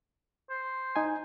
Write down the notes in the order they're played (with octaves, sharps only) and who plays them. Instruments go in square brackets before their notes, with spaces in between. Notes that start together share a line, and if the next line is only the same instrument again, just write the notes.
[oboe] C5
[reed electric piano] D#4 G#5